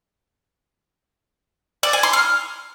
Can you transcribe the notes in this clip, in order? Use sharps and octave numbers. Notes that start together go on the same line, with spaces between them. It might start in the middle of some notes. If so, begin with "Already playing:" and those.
D5
G#5
C6
F6